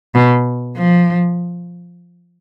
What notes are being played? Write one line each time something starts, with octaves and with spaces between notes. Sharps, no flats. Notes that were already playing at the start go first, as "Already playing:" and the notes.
B2
F3